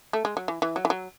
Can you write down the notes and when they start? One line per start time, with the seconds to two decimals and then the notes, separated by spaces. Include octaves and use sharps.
0.13 A3
0.25 G#3
0.37 F#3
0.48 E3
0.62 E3
0.76 F#3
0.85 E3
0.90 F#3